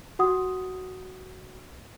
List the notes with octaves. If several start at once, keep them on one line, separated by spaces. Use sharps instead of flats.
F#4 F#5 D#6